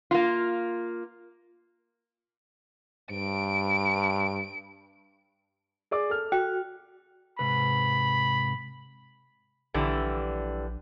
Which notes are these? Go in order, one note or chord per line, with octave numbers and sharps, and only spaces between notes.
A#3 F4
G2 D7
G#4 D5 D6
A4 F6
F#4 G5
G#2 C3 B4 B5
A#1 D3 E3 G3